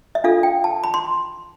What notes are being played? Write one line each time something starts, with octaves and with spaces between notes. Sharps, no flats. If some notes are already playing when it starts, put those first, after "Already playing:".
E5
D4 F4 A4 F5
G5
A5
B5
C6